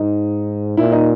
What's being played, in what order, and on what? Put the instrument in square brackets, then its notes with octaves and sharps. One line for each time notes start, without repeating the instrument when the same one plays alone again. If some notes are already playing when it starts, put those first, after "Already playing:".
Already playing: [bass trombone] G#2 [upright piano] D#4
[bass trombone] A#2 [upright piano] E4
[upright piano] D#4